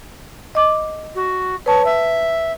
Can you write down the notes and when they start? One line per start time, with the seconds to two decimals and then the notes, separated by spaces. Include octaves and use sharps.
0.55 D#5 D6
1.15 F#4
1.66 B4 C#5 A5
1.85 E5